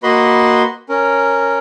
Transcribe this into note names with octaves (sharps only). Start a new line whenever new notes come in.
A#3 F#4 B4 D#5 B5 C6
C#4 A#4